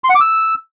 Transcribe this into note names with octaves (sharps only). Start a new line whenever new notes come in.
C6
F#5
D6
E6